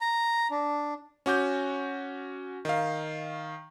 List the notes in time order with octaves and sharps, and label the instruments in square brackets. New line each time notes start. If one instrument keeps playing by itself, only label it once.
[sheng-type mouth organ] A#5
D4
[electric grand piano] C#4 F#4 D6 G6
D#3 F5